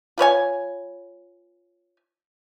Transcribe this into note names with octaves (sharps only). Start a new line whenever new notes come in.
F4 B4 C#5 G#5